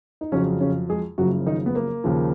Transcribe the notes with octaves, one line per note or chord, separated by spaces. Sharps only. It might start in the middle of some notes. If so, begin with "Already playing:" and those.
D#4
F2 C#3 F#3 C#4
C#3 C#4
G#3 G#4
F#1 F#2 C#3 F3 F#3 F#4
D#3 D#4
B3
A#3
D#2 C#3 F3